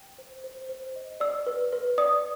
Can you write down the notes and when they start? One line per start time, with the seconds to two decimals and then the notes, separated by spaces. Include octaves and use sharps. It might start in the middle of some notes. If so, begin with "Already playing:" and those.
Already playing: G5
0.18 C5
0.44 C5
0.69 C5
0.95 D#5
1.20 D5 E6
1.47 B4
1.73 B4
1.98 D5 D#6